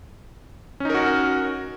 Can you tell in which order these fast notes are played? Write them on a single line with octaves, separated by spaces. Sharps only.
C#4 D#4 A#4 F#4